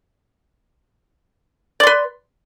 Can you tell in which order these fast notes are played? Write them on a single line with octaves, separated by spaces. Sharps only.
D5 C6 B4